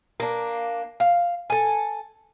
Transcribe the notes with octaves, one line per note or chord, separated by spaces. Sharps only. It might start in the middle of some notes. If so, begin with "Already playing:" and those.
A#3 D4
F5
A4 G#5